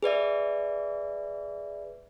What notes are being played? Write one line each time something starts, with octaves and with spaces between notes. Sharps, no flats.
G#4 B4 D5 E5